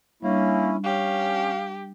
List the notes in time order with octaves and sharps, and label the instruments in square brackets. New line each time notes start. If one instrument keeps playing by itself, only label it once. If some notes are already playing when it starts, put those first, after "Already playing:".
[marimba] G3 D4 [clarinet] A#3 [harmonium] C#4 E4
[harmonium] C#4 [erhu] G4 [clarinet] F5